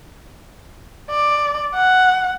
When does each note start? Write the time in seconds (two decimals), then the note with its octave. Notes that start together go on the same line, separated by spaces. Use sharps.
1.10 D5
1.75 F#5